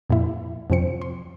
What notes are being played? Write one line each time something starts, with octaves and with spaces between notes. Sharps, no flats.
F2 A#2 F3 E4
F2 C3 F3 C4 C#7
C6